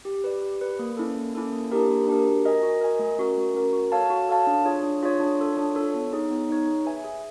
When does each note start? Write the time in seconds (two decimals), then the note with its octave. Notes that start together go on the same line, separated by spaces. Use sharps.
0.05 G4
0.24 B4 D5
0.42 G4
0.61 B4 D5
0.79 A#3
0.97 C#4 E4 A4
1.17 A#3
1.35 C#4 E4 A4
1.53 A#3
1.71 D4 G4 A#4
1.89 A#3
2.08 D4 G4 A#4
2.26 F#4
2.45 A#4 D#5 G#5
2.63 F#4
2.81 A#4 D#5 G#5
2.99 A3
3.19 C#4 F#4 A#4
3.37 A3
3.55 C#4 F#4 A#4
3.73 F#4
3.92 A4 C#5 F5 A5
4.10 F#4
4.29 A4 C#5 F5 A5
4.47 D4
4.65 F4 G#4 C#5
4.83 D4
5.03 F4 G#4 C#5
5.20 D4
5.39 F4 A4 C#5
5.57 D4
5.75 F4 A4 C#5
5.94 B3
6.13 D#4 G#4 C#5
6.31 B3
6.49 D#4 G#4 C#5
6.67 G#4
6.85 B4 E5 G#5
7.04 G#4